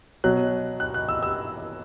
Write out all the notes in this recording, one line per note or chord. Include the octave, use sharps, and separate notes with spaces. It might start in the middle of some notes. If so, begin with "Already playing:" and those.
B2 F#3 F#6
F#6
F#6
E6
E6